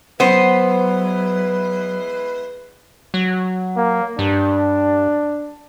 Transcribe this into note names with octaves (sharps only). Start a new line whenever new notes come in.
F#3 G#3 B3 E4 B4 C5
F#3
A#3
G2 D4